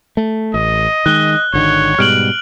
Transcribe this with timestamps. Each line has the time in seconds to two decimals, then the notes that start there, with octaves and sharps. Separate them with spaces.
0.17 A3
0.54 A1 D#5
1.06 D#3 G#3 F#6 G7
1.53 G#1 D3 D#3 C#5
1.99 G#2 B2 G3 F6 D7 F#7